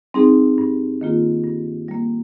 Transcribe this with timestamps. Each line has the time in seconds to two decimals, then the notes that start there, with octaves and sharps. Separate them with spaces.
0.14 G3 C4 D#4 G#4
0.58 G2
1.01 D#3 A#3 F4 G#4
1.44 G2
1.88 G3 A#3